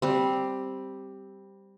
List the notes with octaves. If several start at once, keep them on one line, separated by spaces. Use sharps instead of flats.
G3 C4